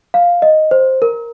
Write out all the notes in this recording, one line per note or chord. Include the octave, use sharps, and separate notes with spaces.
F5
D#5
C5
A#4